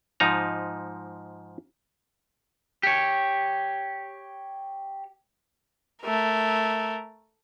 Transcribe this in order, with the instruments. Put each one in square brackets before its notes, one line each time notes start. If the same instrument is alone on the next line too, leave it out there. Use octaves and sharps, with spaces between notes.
[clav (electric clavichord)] G#2 F3 D#4 A#5
[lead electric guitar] G4 C#5
[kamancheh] A3 A#4